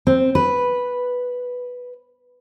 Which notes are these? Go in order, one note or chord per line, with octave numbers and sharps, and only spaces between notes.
C4
B4